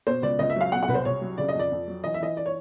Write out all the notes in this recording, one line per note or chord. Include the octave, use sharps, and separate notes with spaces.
B2 C5
C#2 D5
C#2 D#5
E5
F#3 F5
B2 F#5
F#5
C2 B4
C5
C2 C#5
F#3
C#3 D5
D#5
F2
D5
F2
F#3
E3 D#5
E5
E3 D#5
D5
C#5